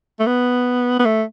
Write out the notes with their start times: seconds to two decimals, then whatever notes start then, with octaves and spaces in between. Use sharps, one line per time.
0.20 A3
0.26 B3
0.99 B3
1.05 A3